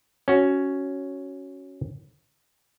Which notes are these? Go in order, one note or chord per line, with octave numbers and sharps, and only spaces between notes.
C#4 F#4